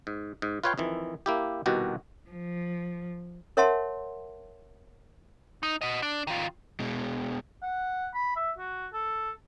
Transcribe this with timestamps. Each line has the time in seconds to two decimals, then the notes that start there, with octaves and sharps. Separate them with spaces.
0.07 G#2
0.42 G#2
0.64 F4 B4 C#5 F5 G5
0.78 F2 D#3 E3
1.26 A#3 E4 G4
1.66 C2 B2 D#3 F#4 G4
2.30 F3
3.57 A#4 C#5 E5 F#5 A5 C6
5.63 D#4
5.82 F#4 D#5
6.02 D4
6.27 D#3 F4
6.80 B2 G#3
7.62 F#5
8.14 B5
8.36 E5
8.58 F#4
8.93 A4